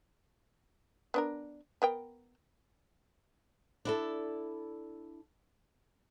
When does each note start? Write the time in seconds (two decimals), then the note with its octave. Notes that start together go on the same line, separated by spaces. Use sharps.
1.14 B3 D4 A#4
1.82 B3 A#4 G5
3.85 D4 E4 A4